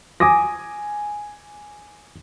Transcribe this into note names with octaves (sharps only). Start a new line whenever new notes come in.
G#5 D6 D#6 A#6